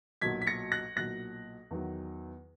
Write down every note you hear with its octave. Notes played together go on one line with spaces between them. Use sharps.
B1 A#2 F#3 G#6 B6
B6
A#6 C#7
F#6 A#6
B1 A#2 F#3 F#6 A#6
E2 D#3 F#3